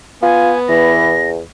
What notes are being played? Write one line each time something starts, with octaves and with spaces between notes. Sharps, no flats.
B3 F4 G#5
E2 E3 A#6